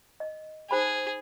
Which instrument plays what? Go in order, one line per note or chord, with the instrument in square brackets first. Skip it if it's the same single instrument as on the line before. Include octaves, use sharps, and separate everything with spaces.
[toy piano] D#5
[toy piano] D#4 C5 B5 [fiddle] G#4